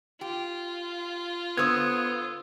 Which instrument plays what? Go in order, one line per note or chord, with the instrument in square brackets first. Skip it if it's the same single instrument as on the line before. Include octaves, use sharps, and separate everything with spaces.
[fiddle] F4 [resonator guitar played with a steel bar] G4
[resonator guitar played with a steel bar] D3 C5 [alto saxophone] B3 [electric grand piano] D#6 E6 G#6